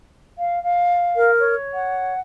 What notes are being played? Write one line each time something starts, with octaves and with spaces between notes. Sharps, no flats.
F5
F5
A#4
C#5
F#5